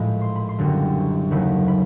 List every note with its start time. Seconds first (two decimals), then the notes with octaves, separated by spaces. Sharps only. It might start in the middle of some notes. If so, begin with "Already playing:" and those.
Already playing: A#1 A2 F3 G#3 B5
0.21 C6
0.36 B5
0.49 C6
0.58 F#1 F#2 D3 G3
1.31 D#2 C#3 F#3 A3 B5
1.68 B5